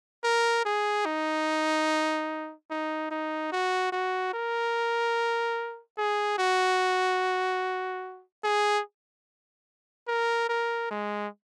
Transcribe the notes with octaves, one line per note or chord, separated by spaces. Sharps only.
A#4
G#4
D#4
D#4
D#4
F#4
F#4
A#4
G#4
F#4
G#4
A#4
A#4
G#3